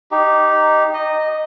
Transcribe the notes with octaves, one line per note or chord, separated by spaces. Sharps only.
D#4 G4
D#5